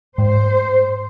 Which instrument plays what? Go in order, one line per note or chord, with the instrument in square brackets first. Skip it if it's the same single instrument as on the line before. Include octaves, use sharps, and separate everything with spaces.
[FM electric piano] G#2 [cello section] C5